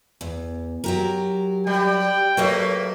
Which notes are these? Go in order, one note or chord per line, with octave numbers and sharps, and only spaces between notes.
E2
F#3 G4 A#4
G3 G5
F#3 A3 A#3 A#4 B4 D#5